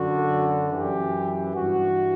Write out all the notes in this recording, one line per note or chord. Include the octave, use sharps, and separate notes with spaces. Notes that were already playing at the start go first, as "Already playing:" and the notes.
Already playing: F#2 D3 F#4
F#2 E3 G4
G2 E3 F#4